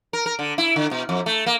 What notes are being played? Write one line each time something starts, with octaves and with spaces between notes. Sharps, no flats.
A#4
A#4
D3
E4
D3
B2
F2
A3
A#3